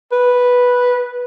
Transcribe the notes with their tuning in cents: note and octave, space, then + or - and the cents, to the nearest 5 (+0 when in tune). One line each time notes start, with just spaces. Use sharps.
B4 -5